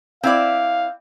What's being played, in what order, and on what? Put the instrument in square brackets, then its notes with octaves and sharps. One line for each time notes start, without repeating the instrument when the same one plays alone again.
[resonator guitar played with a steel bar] C4 E4 D5 [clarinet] F5